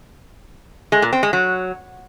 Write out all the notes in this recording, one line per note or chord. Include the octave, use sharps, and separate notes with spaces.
G#3
A#2
C4
G#3
F#3